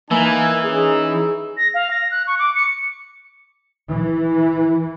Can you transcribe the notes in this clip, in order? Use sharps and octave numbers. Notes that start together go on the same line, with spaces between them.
E3 A#3 D#4 A#4 G#5
C#4 D#4 G#4
A#6
F5
A#6
F#6
C#6
D6
C#7
E3